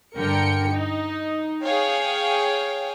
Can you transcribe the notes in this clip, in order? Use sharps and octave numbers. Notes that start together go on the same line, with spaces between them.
G2 D3 A#4 G5 C#7
D#4
G#4 C#5 F5 G5